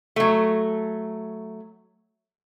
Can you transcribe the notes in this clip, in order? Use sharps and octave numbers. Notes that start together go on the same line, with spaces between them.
F#3 A3